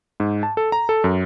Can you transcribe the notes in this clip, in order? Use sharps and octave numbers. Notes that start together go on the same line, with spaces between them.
G#2
A5
A4
A#5
A4
F#2